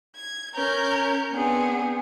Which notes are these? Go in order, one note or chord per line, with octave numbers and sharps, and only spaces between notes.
G#6
C#4 A#4 G6
B3 C4 D4 G#4